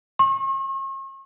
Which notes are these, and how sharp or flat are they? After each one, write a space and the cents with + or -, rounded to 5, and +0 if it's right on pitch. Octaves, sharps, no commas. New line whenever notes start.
C#6 -45